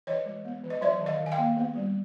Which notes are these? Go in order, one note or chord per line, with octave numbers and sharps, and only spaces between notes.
E3 C#5 D#5
G#3
B3
E3
D#5
F#3 D5 E5
D#3
D#5 F5
D#3
G#5
F5 G5
A#3
B3
G3